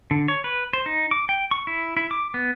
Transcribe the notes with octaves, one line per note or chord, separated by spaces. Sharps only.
D3
C#5
B4
C5
D#4
D6
G5
C#6
E4
E4
D6
B3